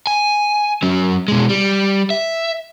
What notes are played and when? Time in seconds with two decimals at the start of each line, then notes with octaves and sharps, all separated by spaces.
0.07 G#5
0.83 F#3 C#4
1.28 B2 G#3
1.49 G3
2.10 E5